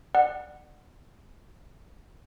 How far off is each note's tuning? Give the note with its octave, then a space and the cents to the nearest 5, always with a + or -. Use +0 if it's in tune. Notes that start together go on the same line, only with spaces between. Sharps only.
D5 +35 F#5 +0